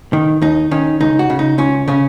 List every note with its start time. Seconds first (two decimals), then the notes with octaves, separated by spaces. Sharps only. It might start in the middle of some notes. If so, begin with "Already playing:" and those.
0.13 D#3
0.41 D#2 D#4
0.71 D#3 C#4
1.00 C#2 D#4
1.19 F#4
1.30 C#3
1.39 D#4
1.58 C#2 C#4
1.88 C#3 C#4